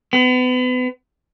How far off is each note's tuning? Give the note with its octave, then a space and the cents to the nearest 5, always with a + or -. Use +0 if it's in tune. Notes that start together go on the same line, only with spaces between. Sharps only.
B3 +35